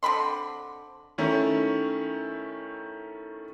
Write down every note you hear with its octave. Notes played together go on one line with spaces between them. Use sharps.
D3 C4 B5 C6
D#3 A3 C#4 E4 A#4